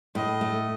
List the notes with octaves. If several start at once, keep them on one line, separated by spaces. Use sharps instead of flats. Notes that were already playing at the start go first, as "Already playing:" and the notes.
A2 D#5
A3